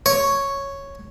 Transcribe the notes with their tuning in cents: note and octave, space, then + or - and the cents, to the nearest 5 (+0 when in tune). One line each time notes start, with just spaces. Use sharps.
C#5 +0